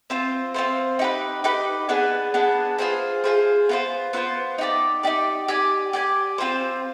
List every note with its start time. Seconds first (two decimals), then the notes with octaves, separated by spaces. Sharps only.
0.10 C4 F4 C5
0.54 C4 F4 C5
0.99 D#4 G4 B4
1.44 D#4 G4 B4
1.89 B3 D4 G#4 B4
2.34 B3 D4 G#4 B4
2.78 F4 G#4 C5
3.24 F4 G#4 C5
3.69 B3 F4 C5
4.13 B3 F4 C5
4.58 D#4 G4 D5
5.03 D#4 G4 D5
5.48 G4 D5 G#5
5.93 G4 D5 G#5
6.38 C4 F4 C5